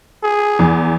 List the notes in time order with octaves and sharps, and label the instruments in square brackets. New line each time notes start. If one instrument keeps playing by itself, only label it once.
[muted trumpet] G#4
[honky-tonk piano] E2